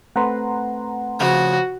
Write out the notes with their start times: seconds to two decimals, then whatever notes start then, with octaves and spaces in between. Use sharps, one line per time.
0.16 A3 C4 B4 F#5 A#5 C6
1.20 C#3 F3 F#4